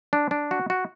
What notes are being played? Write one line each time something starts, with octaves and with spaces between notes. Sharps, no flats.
D4
D4
F#4
F#4